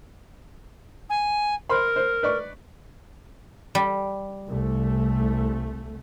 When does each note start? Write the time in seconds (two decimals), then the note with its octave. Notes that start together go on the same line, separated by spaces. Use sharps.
1.09 G#5
1.69 A#4 C5 B5 C6
1.96 C5
2.23 B4 D5 C#6
3.75 G3
4.49 C2 A3